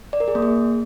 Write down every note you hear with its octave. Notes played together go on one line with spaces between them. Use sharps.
D5
A#4
G#4
A#3
G#4